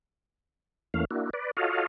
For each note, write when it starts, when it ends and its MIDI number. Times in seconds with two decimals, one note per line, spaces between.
0.94 1.05 40
0.94 1.05 52
0.94 1.05 57
0.94 1.05 58
0.94 1.05 61
0.94 1.05 77
1.11 1.30 58
1.11 1.30 62
1.11 1.30 64
1.11 1.30 66
1.33 1.51 71
1.33 1.51 74
1.57 1.86 65
1.57 1.86 66
1.57 1.86 69
1.57 1.86 73
1.57 1.86 75
1.57 1.86 77